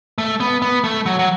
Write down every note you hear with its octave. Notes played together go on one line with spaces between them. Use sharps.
A3
B3
B3
A3
F#3
F#3